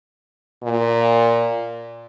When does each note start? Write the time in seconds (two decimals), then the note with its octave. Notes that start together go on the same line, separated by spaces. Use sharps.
0.63 A#2